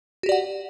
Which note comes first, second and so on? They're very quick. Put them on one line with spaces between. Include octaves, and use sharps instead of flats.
F#4 G4 D5 F#5